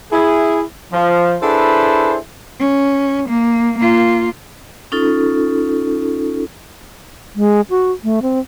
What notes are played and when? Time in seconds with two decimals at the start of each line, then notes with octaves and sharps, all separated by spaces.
0.12 E4 G#4
0.93 F3
1.42 D4 E4 G#4 A4 B4 C5
2.59 C#4
3.29 A#3
3.78 A#3 F4
4.92 C#4 D#4 F4 A4
7.35 G#3
7.70 F#4
8.04 A3
8.22 C4